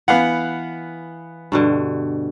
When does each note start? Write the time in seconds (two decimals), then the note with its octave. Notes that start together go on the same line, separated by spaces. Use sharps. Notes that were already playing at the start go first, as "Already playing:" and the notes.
0.08 E3 B3 F5 F#5
1.52 G2 B2 D3